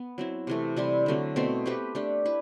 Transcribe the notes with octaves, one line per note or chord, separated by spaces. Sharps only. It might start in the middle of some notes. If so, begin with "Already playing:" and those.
Already playing: B3
F#3 C4 E4
C3 E3 A3
C3 G3 C4 E4
D3 F#3 A3 C4
B2 A3 C4
A3 C4 G4 B4
A3 D4 G4
E4 B4